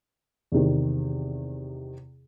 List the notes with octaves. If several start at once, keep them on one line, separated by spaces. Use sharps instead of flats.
E2 C3 D#3